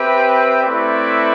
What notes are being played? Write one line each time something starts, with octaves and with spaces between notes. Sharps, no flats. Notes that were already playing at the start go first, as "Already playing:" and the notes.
Already playing: C4 G4 B4 E5 G5
A3 C4 E4 B4 D5